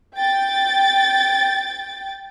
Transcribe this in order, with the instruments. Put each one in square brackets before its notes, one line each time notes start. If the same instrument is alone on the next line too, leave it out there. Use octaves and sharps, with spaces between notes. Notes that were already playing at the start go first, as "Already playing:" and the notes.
[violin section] G5 A6